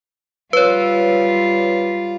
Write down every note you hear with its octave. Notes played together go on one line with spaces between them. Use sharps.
G3 F4 B4 C#5